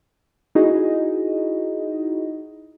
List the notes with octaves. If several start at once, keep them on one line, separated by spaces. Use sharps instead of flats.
D#4 E4 F#4 G#4 D#5